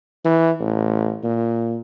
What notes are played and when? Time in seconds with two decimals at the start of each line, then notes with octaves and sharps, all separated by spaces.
0.25 E3
0.60 A1
1.24 A#2